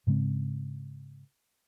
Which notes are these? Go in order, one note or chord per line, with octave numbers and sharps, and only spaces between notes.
G#2 C#3 G#3 C4